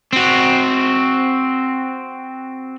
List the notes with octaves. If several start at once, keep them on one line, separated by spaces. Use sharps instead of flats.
C4 F#4